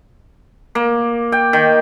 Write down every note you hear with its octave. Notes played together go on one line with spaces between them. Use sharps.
A#3
G5
D#3